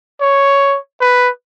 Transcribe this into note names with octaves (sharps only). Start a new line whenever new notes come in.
C#5
B4